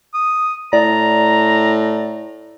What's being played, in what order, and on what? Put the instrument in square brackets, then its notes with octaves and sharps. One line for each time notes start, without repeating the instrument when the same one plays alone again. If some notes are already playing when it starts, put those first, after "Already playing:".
[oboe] D#6
[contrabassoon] A2 [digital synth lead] D5 [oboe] A#5